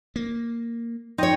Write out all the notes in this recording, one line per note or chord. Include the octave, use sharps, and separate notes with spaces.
A#3
D#4 C5 C#5 G5 D#6